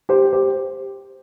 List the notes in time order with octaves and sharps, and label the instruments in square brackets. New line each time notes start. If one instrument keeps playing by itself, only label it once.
[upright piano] G4 C5
G4 C5